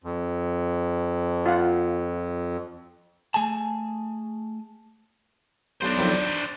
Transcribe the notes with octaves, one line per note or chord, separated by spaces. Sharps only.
F2
F4 F5 F#5
A3 G#4 G#5 A5
B1 D4 C5
B1 F2 D#3
D5